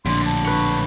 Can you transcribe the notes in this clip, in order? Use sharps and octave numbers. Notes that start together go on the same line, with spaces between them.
A#1 A2 D3 C6
A5
B4 C#6